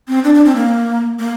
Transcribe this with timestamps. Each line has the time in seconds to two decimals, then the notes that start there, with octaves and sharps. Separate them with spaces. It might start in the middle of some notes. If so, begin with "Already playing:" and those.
0.08 C4
0.24 D4
0.34 D4
0.45 C4
0.56 A#3
1.19 A#3